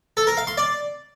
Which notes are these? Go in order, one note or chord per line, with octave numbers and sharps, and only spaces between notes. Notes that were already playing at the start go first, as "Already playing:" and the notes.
A4
A#4
F5
C6
D5